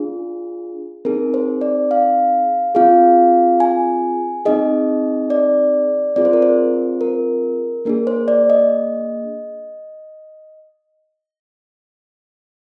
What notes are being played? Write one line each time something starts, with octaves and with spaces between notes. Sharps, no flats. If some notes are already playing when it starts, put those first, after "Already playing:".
Already playing: D4 F4 G#4
C4 D#4 G#4 A#4
C5
D5
F5
C4 F4 G#4 F5
G#5
C4 D#4 G#4 D#5
D5
C4 F4 G#4 D5
C5
A#4
C5
A#4
A#3 D4 G#4 A#4
C5
D5
D#5